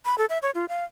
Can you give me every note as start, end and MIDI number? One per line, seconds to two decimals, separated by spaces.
0.05 0.15 83
0.18 0.25 69
0.30 0.38 76
0.42 0.51 73
0.55 0.65 65
0.69 0.84 77